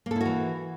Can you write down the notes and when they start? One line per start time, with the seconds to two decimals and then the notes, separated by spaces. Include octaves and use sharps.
0.06 A#3
0.11 A4
0.16 E4
0.21 F#4
0.25 E3